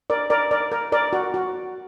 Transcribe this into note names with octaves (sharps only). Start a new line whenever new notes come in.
A#4 D5
A#4 D5
A#4 D5
A#4
A#4 D5
F#4
F#4